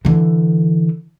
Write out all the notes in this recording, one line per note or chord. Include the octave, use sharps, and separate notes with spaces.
D3 E3